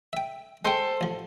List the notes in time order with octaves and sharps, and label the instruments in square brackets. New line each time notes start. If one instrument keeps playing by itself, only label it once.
[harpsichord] E5 G5
[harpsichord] G#3 G5 [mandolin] A4 C5
[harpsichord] A1 F3